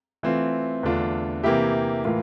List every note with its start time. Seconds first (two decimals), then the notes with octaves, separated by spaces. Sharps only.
0.23 E3 A3 C4 F4
0.83 E2 D3 A3 D4 F4
1.44 C3 E3 A#3 E4 G4
2.04 A2 E3 A#3 F4